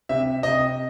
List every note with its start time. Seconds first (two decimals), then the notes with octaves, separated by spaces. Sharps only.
0.09 C3 E5
0.43 C3 D#5